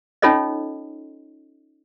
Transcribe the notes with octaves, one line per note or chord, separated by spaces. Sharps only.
C#4 D#4 F4 A4 C#5 D#5